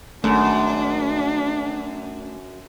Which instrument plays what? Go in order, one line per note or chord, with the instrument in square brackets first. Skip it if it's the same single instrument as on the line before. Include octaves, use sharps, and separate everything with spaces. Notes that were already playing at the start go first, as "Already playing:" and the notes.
[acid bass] G#1 [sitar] F#2 [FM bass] A3 [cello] D4